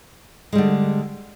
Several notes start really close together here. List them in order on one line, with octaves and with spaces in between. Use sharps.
G#3 G3 D3